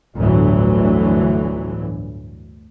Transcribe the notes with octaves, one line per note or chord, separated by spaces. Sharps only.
G1 D2 A2 D3 E3 F#3